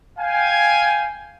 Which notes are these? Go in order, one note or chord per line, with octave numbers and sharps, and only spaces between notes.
F5 G5 G#5